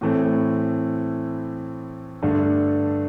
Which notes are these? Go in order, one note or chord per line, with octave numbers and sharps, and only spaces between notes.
A2 E3 A3 C4
G2 D3 A3 D4